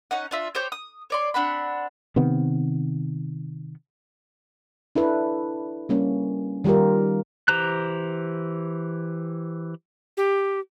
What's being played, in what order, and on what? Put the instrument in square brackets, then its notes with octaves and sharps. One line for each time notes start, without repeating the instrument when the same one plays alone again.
[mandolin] C#4 D#4 F#5
D4 F4 E5
G4 C5 C#5 G6
D#6
C#5 D5 C6
C4 D4 F#5 B5
[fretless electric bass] C3 D#3 B3
[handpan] D4 E4 A4 B4
G3 A#3 C#4
D#3 G3 F4 G4 A#4
[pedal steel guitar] E3 G4 C5 A#5 F#6
[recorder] G4